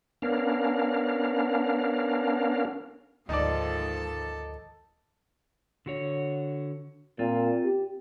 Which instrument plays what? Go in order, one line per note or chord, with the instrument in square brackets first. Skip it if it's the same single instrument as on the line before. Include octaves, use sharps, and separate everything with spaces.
[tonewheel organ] B3 C#4 D4 A#4 F5
[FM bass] D2 [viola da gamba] G#2 D#3 F3 [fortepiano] D#4 D5 [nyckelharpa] A4 A5
[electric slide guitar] D3 F#4 C#5
[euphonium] A#2 [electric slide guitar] C4 F4
[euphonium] G4